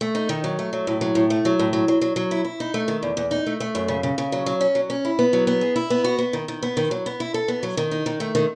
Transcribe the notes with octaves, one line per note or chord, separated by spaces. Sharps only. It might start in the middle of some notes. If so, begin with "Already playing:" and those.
A3
D#4
D#3
F#3
A3
F#3
A2
F#3
A2
A3
F#3
A2
F#3
F#3
F#3
F#3
E4
E4
D#4
A3
D#3
E2
E2
D#4
A3
A3
F#2
C#3
C#3
C#3
F#3
F#3
C#4
F#3
C#4
E4
B3
F#3
B3
G#4
E4
B3
F#4
B3
D#3
D#3
B3
D#3
F#3
B3
E4
A4
B3
F#3
D#3
D#4
D#3
A3
D#3